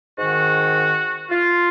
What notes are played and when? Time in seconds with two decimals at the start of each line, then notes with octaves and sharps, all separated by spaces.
0.18 G#2 D#3 F#4
1.30 F4